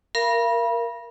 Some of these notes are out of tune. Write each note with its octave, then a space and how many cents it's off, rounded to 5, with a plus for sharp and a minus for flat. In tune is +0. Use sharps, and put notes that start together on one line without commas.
A#4 -5 F5 -40 B5 -30